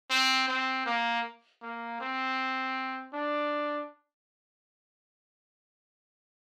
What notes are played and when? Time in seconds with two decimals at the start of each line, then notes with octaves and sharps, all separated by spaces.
0.10 C4
0.48 C4
0.86 A#3
1.62 A#3
2.00 C4
3.13 D4